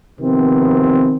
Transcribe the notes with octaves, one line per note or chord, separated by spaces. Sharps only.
C3 D#3 F3 B3 C4